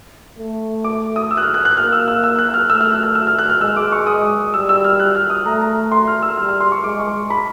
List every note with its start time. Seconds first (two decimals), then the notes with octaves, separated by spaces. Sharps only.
0.39 A3
0.84 D6
1.16 D#6
1.31 E6
1.37 F#6
1.43 F6
1.54 F#6
1.65 F#6
1.77 A#3 F6
1.93 E6
2.08 E6
2.24 E6
2.39 F#6
2.54 F6
2.70 A3 E6
2.81 F6
2.92 F#6
3.03 F6
3.15 E6
3.27 F6
3.39 F#6
3.50 F6
3.61 G#3 E6
3.77 D6
3.92 C#6
4.07 D#6
4.53 G3 E6
4.69 E6
4.84 F6
5.00 F#6
5.15 F6
5.30 D#6
5.45 A3 A#5
5.61 A#5
5.92 C6
6.08 F6
6.23 E6
6.37 G3 F6
6.49 F6
6.60 C6
6.72 C#6
6.84 G#3 D6
6.99 C#6
7.30 B5